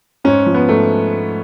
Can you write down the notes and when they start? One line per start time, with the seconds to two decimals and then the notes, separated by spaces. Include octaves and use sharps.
0.24 G#2 C#4
0.46 F3
0.54 B3
0.69 G#2 A3